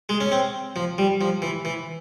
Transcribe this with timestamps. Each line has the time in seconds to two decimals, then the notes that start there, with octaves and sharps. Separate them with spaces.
0.09 G#3
0.21 C#4
0.32 C4
0.76 F3
0.98 G3
1.21 F3
1.42 E3
1.65 E3